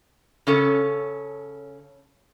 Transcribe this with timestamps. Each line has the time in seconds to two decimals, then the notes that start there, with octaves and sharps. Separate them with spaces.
0.47 C#3 C#4 A4